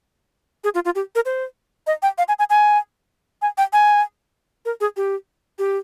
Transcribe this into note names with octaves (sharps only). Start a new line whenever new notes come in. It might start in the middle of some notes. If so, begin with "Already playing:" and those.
G#4
F4
F4
G4
A#4
C5
D#5
G5
F5
G#5
G#5
G#5
G#5
G5
G#5
A#4
G#4
G4
G4